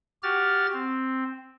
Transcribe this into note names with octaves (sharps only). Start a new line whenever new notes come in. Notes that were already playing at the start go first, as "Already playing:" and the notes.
F#4 G4 F6 A6
C4